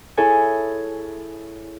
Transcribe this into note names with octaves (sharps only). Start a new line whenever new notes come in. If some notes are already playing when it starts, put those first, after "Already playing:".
E4 G#4 A4 C#5 G#5